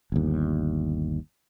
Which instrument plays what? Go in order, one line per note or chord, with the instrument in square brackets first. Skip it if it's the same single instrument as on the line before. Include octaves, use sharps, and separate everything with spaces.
[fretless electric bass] G1 D#2